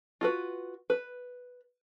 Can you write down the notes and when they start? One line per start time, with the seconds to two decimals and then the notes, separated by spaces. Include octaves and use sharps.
0.21 F4 F#4 B4
0.90 B4